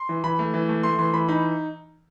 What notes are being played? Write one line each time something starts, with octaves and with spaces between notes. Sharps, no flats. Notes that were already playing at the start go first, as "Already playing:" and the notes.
Already playing: C6
E3
E3 B5
A3
E3
A3
A3 C6
E3 C6
E3 B5
D#4 B5